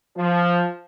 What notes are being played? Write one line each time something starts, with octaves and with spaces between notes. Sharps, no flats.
F3